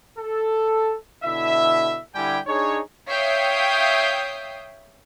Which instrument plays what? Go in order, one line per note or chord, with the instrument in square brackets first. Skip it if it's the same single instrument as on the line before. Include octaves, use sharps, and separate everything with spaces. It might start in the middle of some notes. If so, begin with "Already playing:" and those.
[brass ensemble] A4
B2 D3 E4 E5
D3 G3 E4 G4 G5 G#5
D4 D#4 G#4 C#5
[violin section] C#5 E5 F5 G5 D#6 C7